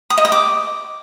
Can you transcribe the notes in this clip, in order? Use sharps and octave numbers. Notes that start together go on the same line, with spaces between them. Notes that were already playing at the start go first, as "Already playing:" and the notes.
D#6
D#5
D#6
D6